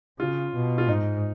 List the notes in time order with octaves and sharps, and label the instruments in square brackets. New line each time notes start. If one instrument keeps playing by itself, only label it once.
[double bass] C#3 [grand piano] F4
[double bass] B2
[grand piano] F4
[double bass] G#2 [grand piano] D#4